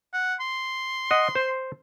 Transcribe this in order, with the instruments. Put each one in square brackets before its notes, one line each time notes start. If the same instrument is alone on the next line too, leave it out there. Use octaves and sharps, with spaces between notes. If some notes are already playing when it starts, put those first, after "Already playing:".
[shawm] F#5
C6
[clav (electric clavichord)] D#5 F#5
C5